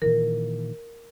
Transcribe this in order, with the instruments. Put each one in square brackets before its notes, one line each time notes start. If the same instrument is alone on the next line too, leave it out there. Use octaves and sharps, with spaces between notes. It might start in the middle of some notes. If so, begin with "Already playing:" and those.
[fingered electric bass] A#2 D#3 E3 [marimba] A#4